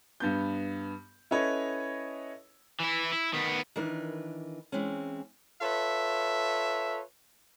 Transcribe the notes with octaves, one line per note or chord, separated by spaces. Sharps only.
G2 B3 G6
C#4 E4 A4 B4 C#5 D#5
E3 E4
E4
D#3 B3
D#3 E3 D4 A#4 B4
E3 G#3 C4 C#4
F4 A4 B4 C#5 E5